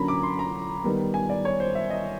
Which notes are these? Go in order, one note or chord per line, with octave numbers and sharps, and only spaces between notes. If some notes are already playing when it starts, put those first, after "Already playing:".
Already playing: D3 F#3 A#3 C#4 A#5 B5
D6
C6
A#5
D#3 G3 B3
G#5
D5
C#5
C5
E5
D#5